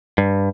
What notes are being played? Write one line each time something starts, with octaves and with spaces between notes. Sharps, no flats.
G2